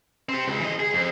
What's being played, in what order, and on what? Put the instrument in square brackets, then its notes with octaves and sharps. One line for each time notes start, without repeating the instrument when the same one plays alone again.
[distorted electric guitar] C4 G4
C#2
E3 D#5
G#4
F2